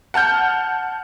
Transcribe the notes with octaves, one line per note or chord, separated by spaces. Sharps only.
F#5 A5 F6 G6